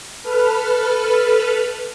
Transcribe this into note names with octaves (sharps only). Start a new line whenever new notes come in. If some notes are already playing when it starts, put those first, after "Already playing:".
A4 B4 F6